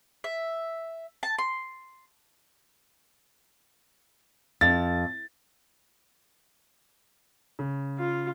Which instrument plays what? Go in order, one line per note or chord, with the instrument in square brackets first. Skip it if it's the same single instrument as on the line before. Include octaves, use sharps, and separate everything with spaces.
[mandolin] E5
A5
C6
[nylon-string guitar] F2 [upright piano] A6
[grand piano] C#3
[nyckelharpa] F4